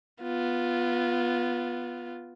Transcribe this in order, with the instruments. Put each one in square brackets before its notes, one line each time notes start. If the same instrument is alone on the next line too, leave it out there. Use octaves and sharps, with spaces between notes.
[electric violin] B3 F4